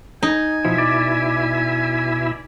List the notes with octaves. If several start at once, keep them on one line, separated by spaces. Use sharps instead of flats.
D#4 G#5
B2 F3 E4 E5
D5